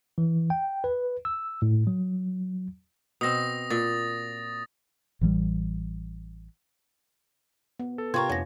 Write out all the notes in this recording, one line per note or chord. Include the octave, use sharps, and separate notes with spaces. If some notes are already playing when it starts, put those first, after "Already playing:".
E3
G5
B4
E6
A2
F#3
B2 C4 D#6 A#6
A#2 A6
A1 E3 F3 G3
B3
A4
C3 C4 F4 G4 A#4 C6 C#6 G#6
F2 A2 C#5 G#5 A#6